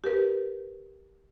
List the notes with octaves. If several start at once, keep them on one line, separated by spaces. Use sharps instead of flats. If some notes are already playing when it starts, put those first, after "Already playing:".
G4 A#4 B4